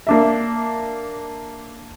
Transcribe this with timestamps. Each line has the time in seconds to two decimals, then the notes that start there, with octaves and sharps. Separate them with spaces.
0.07 A#3 D4 E5